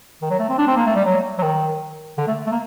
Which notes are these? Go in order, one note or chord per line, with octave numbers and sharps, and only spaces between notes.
D#3
F#3
A3
C4
D4
C4
A#3
A3
G3
F#3
F#3
D#3
D3
A3
A3
A#3